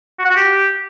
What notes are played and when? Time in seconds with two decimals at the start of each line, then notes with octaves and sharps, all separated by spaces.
0.19 F#4
0.25 F#5
0.31 F#4
0.36 G4